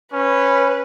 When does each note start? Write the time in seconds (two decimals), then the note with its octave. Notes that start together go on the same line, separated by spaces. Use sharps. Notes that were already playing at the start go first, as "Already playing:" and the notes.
0.13 C#4 B4